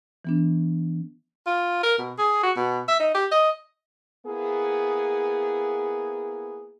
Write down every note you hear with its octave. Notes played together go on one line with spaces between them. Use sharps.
E3 B3 D4
F4
A#4
B2
G#4
F#4
B2
E5
D#4
G4
D#5
A#3 B3 E4 G#4